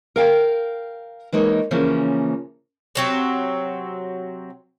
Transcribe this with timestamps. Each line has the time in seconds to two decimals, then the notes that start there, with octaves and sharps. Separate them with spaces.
0.16 A#4 F5 G5
1.32 E3 G#3 A#3 D#4 C#5
1.71 C#3 E3 F3 A#3 C#4
2.95 C3 F#3 C4